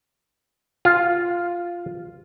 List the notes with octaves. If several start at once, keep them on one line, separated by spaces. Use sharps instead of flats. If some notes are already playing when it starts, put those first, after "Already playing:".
F4